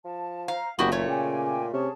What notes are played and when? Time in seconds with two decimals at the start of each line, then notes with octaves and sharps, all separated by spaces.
0.05 F3 A5
0.48 C5 F5 A#5
0.79 F#1 A#2 B3 F#4 G4 E5
0.92 A3 C#5
1.08 C#3 G5 G#5 D6
1.73 C3 C#4 G#4 A5